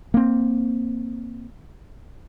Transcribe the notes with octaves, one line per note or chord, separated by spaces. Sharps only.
A#3 C4